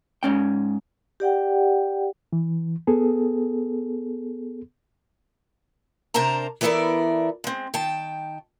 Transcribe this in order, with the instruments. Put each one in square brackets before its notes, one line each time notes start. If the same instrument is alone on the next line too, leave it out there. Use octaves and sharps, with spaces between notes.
[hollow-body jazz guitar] G#2 C#4 G5
[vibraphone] G4 D5 F#5 G5
[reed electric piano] E3
B3 G#4 A4
[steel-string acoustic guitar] C3 D4 A#4 C5 A5 A#5
E3 B3 E4 A4 A#4 D5
G#3 C4
D#3 G5 A5